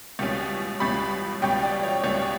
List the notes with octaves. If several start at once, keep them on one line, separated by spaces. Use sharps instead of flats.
C#2 B2 G3 C#4
C#2 B2 G3 C#4 B5
C#2 B2 G3 C#4 G5
D5
C#5
C#2 B2 G3 C#4 C#5